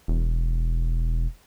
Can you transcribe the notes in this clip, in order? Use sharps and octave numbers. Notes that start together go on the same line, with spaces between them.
E1